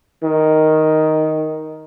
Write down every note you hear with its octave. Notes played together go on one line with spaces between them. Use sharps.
D#3